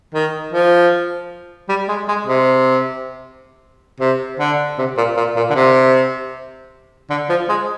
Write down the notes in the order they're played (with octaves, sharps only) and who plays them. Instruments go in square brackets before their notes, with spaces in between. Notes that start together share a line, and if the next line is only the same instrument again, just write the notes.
[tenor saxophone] D#3
F3
G3
G#3
G#3
C3
C3
D3
C3
A#2
A#2
A#2
D3
C3
D3
F3
G#3